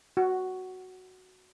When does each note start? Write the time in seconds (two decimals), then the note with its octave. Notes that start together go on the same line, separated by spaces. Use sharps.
0.17 F#4